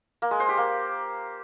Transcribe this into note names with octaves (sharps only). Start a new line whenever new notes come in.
A#3
G#3
C5
G4
A#3